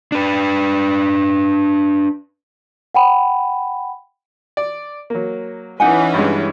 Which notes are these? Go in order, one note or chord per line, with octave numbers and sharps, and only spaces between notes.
D4 B4
F#5 G5 B5
D5
F#3 A#3
E3 C#4 D#4 B4 F#5 G#5
G2 G3 G#3